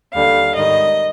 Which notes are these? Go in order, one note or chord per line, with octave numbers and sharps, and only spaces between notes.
D#2 D3 G3 F5
G#2 D#3 G3 D#5